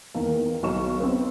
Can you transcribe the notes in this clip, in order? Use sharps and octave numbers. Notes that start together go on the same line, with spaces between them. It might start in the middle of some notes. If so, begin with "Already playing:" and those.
E2 D#3 A#3
B1 C#5 C#6 E7
B3 C4